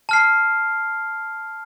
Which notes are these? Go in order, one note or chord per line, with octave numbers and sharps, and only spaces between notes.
A5 F6 C7